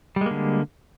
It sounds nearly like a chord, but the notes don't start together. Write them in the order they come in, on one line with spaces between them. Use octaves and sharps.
G3 G#3 A#3 D3